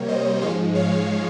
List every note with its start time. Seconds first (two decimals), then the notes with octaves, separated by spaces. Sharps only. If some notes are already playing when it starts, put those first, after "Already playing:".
Already playing: C3 G3 A#3 C#5
0.08 C5 D#5
0.41 G#2 F3 G#3 C#5 F5
0.75 C#5 F5